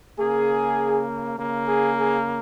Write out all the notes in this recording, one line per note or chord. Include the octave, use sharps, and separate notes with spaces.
C#3 A#3 G#4
C#3 A#3
G#4
G#4